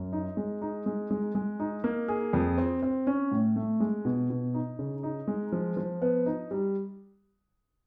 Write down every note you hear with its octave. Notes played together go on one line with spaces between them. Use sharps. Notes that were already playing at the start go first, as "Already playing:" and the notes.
Already playing: F#2
D#4
G#3
D#4
G#3
G#3
G#3
D#4
A#3
G#4
F2
C4
C4
C#4
A2
A3
G#3
B2
B2
D#4
C#3
D#4
G#3
F3
F3
B3
D#4
G3